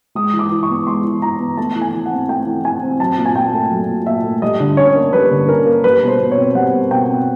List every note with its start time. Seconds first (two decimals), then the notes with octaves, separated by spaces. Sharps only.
0.15 G#3 D#6
0.33 E3
0.39 D6
0.51 E3
0.63 C#6
0.70 B3
0.87 G#3 C6
1.04 E3
1.22 E3 A#5
1.40 B3
1.57 A3 A5
1.75 E3
1.82 G#5
1.94 E3
2.06 F#5
2.11 C4
2.29 A3 G5
2.46 E3
2.64 E3 G#5
2.83 C4
3.00 F#3 A5
3.17 A#2
3.26 G#5
3.35 A#2 G5
3.53 A3
3.71 F#3
3.89 A#2
4.06 A#2 E5
4.24 A3
4.42 G3 D#5
4.60 D3
4.77 C#4 C#5
4.95 A#3
5.13 G3 B4
5.31 D3
5.48 C#4 A#4
5.66 A#3
5.84 G3 B4
6.02 B2
6.08 C5
6.20 B2
6.31 C#5
6.38 C4
6.54 G3 F#5
6.73 B2
6.90 B2 G5
7.09 C4